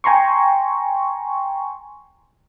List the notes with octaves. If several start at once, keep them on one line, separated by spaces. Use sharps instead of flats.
G5 G#5 A#5 C6 C#6